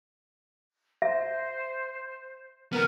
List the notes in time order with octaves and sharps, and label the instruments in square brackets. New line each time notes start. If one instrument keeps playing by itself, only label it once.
[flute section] C5 [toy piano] E5
[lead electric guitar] C#2 B3 [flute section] A#4 F6